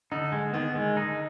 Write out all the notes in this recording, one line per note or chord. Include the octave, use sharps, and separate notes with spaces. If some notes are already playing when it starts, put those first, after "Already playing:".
D3 D#4
G#3
D#3 B3
G#3
D#4